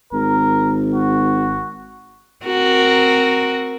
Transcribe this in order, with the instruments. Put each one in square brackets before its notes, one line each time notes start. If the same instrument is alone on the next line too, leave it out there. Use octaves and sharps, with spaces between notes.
[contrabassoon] G#1 [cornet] A#4
[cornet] F#4
[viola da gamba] C4 F#4 A#4